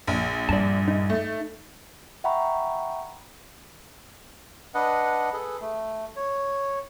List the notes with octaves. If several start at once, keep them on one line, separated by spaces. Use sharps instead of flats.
A#1
G2 D5 A5
D#4
A3
E5 F#5 G5 A#5 B5 C#6
D4 B4 D#5 F#5
G#4 A4 B4
A3
C#5